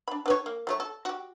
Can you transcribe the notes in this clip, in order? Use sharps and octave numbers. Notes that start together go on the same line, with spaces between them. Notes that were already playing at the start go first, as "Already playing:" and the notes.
D4 B5
D4 B4 C#5
A#3
F#3 A3 C#5
A4
F#4 G4